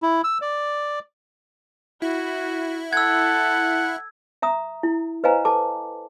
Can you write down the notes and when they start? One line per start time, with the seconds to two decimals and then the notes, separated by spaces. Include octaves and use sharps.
0.02 E4
0.24 E6
0.41 D5
2.02 E4 F#4
2.93 A4 F#5 E6 G#6
4.42 E5 A#5 D#6
4.83 E4
5.24 B4 C5 D#5 F5 G#5 A#5
5.45 A4 A5 D6